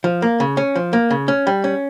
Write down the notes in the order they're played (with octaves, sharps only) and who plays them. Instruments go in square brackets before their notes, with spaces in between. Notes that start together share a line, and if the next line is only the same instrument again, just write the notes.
[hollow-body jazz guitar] F3
A#3
C#3
C#4
F3
A#3
C#3
C#4
G3
C#4